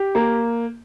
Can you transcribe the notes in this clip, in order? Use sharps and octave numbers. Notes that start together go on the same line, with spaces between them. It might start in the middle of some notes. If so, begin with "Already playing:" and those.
Already playing: G4
A#3